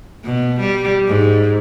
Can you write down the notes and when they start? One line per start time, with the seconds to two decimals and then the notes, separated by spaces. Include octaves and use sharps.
0.24 B2
0.60 G3
1.08 G#2